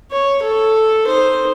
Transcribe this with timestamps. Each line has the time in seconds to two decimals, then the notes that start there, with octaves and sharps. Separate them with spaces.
0.11 C#5
0.42 A4
1.07 D#4 C5